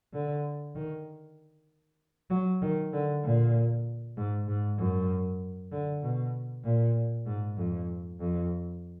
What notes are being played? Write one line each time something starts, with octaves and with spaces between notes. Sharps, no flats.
D3
D#3
F#3
D#3
D3
A#2
G#2
G#2
F#2
D3
B2
A#2
G#2
F2
F2